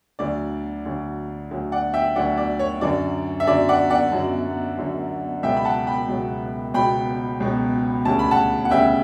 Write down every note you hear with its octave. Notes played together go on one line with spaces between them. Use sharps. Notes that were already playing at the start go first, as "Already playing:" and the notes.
D2 D3 F#3 D5
D2 D3 F#3
D2 D3 F#3
D5 F#5
E5 G5
D2 D3 F#3 D5 F#5
D5
C#5
F#2 D3 F#3 D5
E5
F#2 D3 F#3 D5
D5 F#5
D5 F#5
F#2 D3 F#3
F#2 D3 F#3
C#2 B2 F#3 E5 G5
B5
F#5 A5
G5 B5
C#2 B2 F#3
C#2 B2 F#3 G5 B5
C#2 B2 F#3
D2 C#3 G3 A5
B5
F#5 A5
F#5
D2 C#3 G3 E5 G5